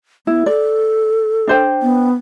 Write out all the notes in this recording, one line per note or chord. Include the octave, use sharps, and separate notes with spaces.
B3 E4
A4 D5
D4 C5 G5
B3